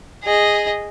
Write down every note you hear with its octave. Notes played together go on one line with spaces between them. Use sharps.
G#4 D#5